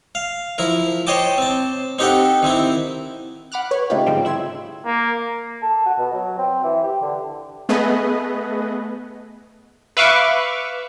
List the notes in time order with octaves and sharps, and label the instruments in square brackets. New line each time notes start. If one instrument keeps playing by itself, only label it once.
[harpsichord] F5
F3 E4 A#4
C5 C#5 D#5 G5 A5 D6
C4 A5
C4 D#4 G4 A4 F#5 G5
D#3 C4 E4
[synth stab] F#5 B5 D6 F6 F#6
B4 C#5
C#3 A3 D#4 F4 G4
G#2 D3 F3 G3 G#3 C4
E4 E5 C6 G#6 E7
[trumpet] A#3
[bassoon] A4
F#4
B2
F#3
C4
E3
G4
D3
[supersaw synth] A3 B3 G#4 B4 D#5
[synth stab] B4 E5 F5 C#6 D6